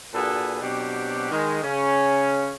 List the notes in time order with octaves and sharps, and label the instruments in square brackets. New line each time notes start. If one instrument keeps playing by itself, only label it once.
[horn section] A#2 D4 F#4 G#4 A4 B4
B2 F#3 C4 D4 G4
D#3 G#3
C#3 C#4